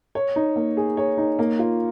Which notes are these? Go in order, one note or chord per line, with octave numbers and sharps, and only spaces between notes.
C#5
D#4
A#3
G#4
C#5
D#4
A#3
F4